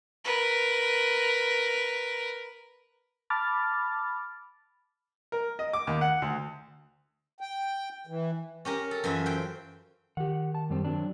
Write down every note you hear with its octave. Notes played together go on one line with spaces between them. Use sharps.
A#4 B4
A5 B5 D6 F6 A6
A#4
D#5
D6
D#2
F#5
D2
G5
E3
C#4 G4 A#4
A4
F#2 E3 F4 E5
C5 G5
D#3 G4 F#5
A5
F#2 G3 C4
F#3 C4 D4